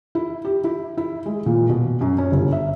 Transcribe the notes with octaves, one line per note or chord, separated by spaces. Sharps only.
E4
G4
E4
E4
G#3
A#2
B2
F#2
C#4
G1
E5